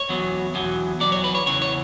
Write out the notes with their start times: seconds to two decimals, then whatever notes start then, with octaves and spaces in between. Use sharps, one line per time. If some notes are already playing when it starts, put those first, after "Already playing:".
Already playing: C#5
0.09 E2 B2 F#3
0.55 E2 B2 F#3
1.00 E2 B2 F#3 D5
1.12 C#5
1.24 B4
1.35 C#5
1.46 E2 C#3 E3 C#5
1.62 C#5